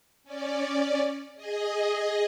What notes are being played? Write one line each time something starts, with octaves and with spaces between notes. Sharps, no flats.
C#4 D5
G#4 D#5